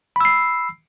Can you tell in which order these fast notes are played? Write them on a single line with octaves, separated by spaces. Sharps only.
B5 E6 C7